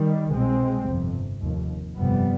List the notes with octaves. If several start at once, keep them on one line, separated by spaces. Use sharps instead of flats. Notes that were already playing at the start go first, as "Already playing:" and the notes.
Already playing: D#3 G3
C2 B2 G#3 C4
G1 F2 C3
F1 D#2
G1 F2 C3 G3 B3